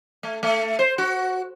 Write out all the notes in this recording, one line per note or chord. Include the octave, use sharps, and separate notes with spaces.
A3
A3
C5
F#4